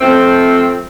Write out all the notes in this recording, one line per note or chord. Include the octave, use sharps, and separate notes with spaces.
F3 A3 C4